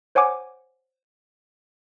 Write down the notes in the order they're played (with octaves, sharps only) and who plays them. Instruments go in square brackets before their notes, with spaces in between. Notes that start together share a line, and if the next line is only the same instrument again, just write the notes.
[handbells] C5 C#5 F#5 G#5 D6